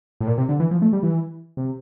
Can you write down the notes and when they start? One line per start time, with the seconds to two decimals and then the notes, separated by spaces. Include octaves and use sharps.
0.21 A2
0.27 A#2
0.38 C3
0.49 D3
0.60 E3
0.71 F3
0.82 A3
0.93 G3
1.03 E3
1.57 C3